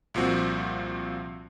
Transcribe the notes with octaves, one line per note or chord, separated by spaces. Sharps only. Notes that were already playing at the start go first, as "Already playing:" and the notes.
C2 A#2 F3 C4 F#4